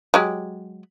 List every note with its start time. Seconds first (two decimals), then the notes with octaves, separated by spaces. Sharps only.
0.14 F#3 G#3 G4